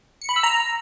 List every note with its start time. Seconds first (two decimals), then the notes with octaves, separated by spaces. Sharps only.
0.22 C#7
0.29 B5
0.36 E6
0.43 A#5